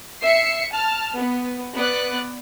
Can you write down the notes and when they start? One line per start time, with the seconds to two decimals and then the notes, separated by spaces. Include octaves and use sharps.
0.23 E5 C7 C#7
0.74 A5 F6
1.18 B3
1.77 B3 D5 F#6